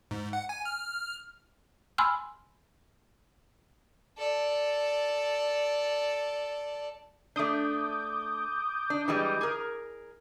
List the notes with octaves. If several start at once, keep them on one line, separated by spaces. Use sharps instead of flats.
G#2
F#5
G#5
F6
G#5 B5 C6 E6 F6
A4 D5
A3 D4 D6 D#6 G6
D4
E3 G3 G#3
G#4 A#4